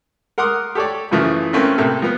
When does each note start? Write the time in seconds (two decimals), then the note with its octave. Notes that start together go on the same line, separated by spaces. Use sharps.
0.38 A#4 F#5 C6 D6 D#6
0.75 G4 A4 C#5 D5
1.11 F#2 C#3 E3 F3 A3
1.53 A3 A#3 C4 C#4 A#4 B4
1.78 A2 C3 A#3 A4
2.02 F3 B3